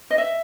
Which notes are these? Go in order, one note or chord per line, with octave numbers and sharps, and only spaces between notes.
D#5
E5